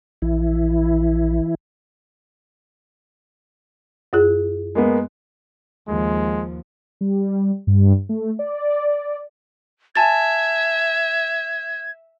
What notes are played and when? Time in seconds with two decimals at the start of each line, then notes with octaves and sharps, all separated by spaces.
0.22 A#1 E3 E4
4.13 F#2 F4 G#4
4.75 G#3 A#3 B3
5.88 D#2 F3 G#3
7.01 G3
7.67 G2
8.09 A3
8.39 D5
9.95 E5 G#5 A5 G#6 A6